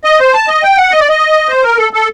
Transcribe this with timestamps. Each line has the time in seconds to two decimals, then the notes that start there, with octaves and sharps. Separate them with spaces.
0.04 D#5
0.20 C5
0.34 A5
0.48 D#5
0.63 G5
0.77 F#5
0.91 D#5
1.00 D5
1.09 D#5
1.49 C5
1.63 A#4
1.78 A4
1.93 A4